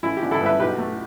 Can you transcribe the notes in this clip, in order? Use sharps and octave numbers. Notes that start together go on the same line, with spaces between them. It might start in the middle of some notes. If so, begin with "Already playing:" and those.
A1 E4
G4
D3
E4 A4
G2
B4 E5
B1 G4 B4
A3